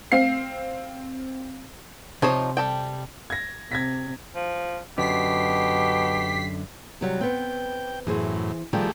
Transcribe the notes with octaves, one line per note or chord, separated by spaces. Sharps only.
C4 F5 C7
C3 F3 D#4 C5 C#5
G3 A4 G5
G#6 A#6
C3 G#6 A#6 B6
F3
F#2 B2 D3 G4 B6 C7
C3 F#3 G3
B3 C4 G5
F#2 A2 E3 G#4 C5
D#3 F3 G3 A3 G4 G#4